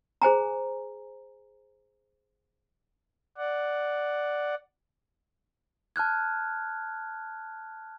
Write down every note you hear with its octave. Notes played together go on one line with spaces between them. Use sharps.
G#4 C5 G#5 A#5
D5 F#5
A5 F6 F#6 G#6